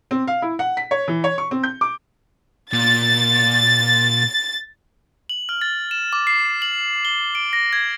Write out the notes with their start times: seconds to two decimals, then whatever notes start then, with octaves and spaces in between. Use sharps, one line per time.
0.11 C4
0.27 F5
0.42 E4
0.59 F#5
0.77 B6
0.91 C#5
1.08 E3
1.24 C#5
1.38 C#6
1.51 C4
1.63 G6
1.81 D6
2.73 A#2 A6
5.29 F#7
5.49 F6
5.61 A6
5.91 E7
6.13 D6
6.27 C7
6.62 F#7
7.05 G7
7.35 D7
7.53 A#6
7.73 G#6